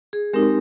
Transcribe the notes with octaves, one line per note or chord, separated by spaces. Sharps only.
G#4
G#3 C4 D#4 G4 A#4